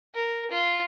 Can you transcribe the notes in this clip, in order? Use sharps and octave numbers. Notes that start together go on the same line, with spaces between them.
A#4
F4